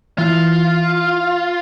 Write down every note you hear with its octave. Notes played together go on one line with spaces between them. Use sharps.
E3 F4